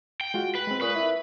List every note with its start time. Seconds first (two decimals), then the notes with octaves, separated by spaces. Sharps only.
0.21 G5
0.34 G#3 F4 F#4
0.55 B4
0.67 G#3 C4
0.81 A#2 B4 C#6 D#6
0.96 E4